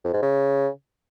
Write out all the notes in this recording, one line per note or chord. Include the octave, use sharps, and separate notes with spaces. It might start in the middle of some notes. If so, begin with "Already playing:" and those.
F2
G#2
C#3